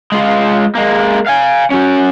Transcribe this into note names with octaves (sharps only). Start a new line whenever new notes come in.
G#3 F4
G#3 A#3
F5 G#5
C#4 F#4